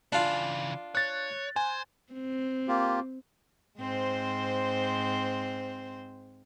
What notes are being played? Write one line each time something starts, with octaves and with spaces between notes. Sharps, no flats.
C#3 E3 D4 F4
C#5 F#6 A6
C5 G#5
C4
A#3 F4 G4
G#2 C4 C5